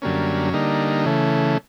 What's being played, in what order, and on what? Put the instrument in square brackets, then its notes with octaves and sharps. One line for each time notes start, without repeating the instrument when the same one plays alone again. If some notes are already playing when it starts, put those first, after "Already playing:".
[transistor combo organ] F#2 D3 G3 A#3 C#4
D3 G3 A#3 D#4
C#3 E3 A3